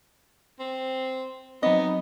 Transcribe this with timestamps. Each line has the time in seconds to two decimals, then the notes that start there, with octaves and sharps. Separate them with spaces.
0.59 C4
1.63 F#3 B3 C4 D#4 D#5